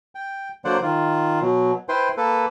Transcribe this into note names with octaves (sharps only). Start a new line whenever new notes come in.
G5
D3 F#3 A#3 C5 D5 F#5
D#3 F4
B2 F#3
E4 B4 C5 G5 C6
A#3 A4 B4